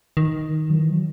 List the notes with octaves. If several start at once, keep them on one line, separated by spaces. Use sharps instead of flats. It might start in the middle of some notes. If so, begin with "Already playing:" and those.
D#3
F#3
E3
F#3